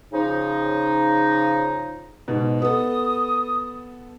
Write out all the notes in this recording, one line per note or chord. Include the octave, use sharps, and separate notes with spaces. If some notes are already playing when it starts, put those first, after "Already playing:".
C#3 F3 D#4
G#2 B2
B3 A4 D#6